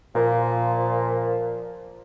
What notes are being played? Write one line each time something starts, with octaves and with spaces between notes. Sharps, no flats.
A#2 F3